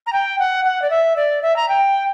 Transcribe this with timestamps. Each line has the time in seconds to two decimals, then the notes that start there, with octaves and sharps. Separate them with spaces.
0.06 A#5
0.12 G5
0.39 F#5
0.64 F#5
0.82 D5
0.90 E5
1.16 D5
1.42 E5
1.56 A#5
1.68 G5